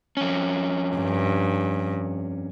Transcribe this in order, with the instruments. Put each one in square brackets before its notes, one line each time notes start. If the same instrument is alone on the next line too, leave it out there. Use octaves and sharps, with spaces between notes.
[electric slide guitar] F2 C#4
[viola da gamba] G2